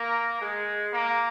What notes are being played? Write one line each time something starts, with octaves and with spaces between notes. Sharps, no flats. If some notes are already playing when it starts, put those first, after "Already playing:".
Already playing: A#3 A#4
G#3 G#4
A#3 A#4